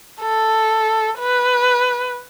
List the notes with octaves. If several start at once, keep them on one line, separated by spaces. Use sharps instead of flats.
A4
B4